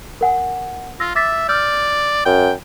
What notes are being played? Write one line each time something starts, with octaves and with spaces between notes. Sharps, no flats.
A#4 F#5 G#5
F4 E6 A#6
E5 D6 A6 B6
D5 E6 F6 G6
F#2 G5